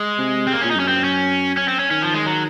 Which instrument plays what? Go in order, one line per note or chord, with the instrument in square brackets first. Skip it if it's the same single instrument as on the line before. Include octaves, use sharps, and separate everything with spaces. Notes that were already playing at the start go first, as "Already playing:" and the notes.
Already playing: [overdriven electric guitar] G#3
[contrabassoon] C3
[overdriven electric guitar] C4
A#3
[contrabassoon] A#2 [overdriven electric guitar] C#4
[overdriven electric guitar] D#4
[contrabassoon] F#2 [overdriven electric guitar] C#4
[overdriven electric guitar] C4
C#4
C#4
C4
C#4
[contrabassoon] D#3 [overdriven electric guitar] C#4
[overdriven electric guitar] F3
G#3
F#3